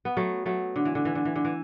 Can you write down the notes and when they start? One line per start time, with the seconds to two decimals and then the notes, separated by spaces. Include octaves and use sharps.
0.05 B3
0.17 F#3 A3
0.46 F#3 A3
0.76 D3
0.85 E3
0.95 D3
1.05 E3
1.15 D3
1.25 E3
1.36 D3
1.45 E3